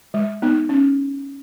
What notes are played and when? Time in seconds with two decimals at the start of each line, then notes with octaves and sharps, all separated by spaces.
0.14 G#3
0.42 B3 D#4
0.69 C#4